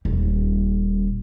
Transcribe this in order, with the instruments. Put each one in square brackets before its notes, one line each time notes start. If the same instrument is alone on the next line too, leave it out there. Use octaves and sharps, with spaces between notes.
[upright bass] D#1 G3